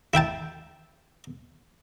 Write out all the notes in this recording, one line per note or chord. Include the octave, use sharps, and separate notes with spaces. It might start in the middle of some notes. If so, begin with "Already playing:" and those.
E4 E5 G5 A5